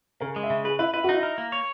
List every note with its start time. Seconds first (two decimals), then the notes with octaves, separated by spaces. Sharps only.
0.21 C#3 A#4
0.36 G#3
0.43 E5
0.50 C#3
0.64 G#4 B4
0.79 E4 B4
0.93 E4 B4
1.04 D#4 F#4
1.14 E4
1.23 A#4
1.38 A#3
1.52 C#5